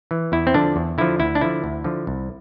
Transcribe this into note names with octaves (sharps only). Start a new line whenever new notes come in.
E3
E2 E4
C4
D3 F3 D4
E2
D3 F3 E4
D2 E4
D4
D3 F3 E4
D2
D3 F3
C2